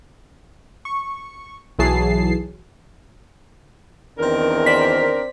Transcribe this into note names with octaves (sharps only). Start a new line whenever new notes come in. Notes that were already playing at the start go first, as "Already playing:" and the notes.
C#6
B1 E3 F#3 G#4 A5 C7
E2 D#3 C4 D4 A#4
C5 D5 B6